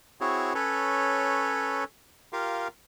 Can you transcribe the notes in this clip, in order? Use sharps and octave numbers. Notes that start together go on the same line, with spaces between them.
C4 E4 F#4 G#4 C#5
C#4 A4 B4 C#5
F4 G4 A#4 F5